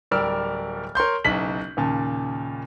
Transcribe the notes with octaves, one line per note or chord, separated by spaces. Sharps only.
D1 G3 A#4 D5 E6 F6
A#4 C#5 C6 G6
F#1 B1 B6 F#7
D#2 A#2 C#3 A5